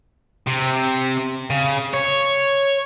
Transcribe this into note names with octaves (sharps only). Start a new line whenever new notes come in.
C3
C#3
C#5